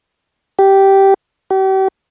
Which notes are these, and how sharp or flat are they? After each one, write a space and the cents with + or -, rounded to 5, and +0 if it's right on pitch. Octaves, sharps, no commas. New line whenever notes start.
G4 -10
G4 -40